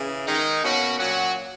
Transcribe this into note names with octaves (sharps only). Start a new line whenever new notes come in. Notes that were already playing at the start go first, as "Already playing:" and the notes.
Already playing: C#3 E3
D#3 G#3 D#4
B2 A#3 C#4 F#4
A#2 F#3 C#4 F#4